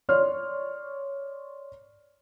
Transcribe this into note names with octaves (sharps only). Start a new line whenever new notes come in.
C#5 D5 C6 F6